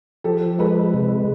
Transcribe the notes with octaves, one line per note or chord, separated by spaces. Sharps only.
F3 G4 A4
G#3 A4 B4
C3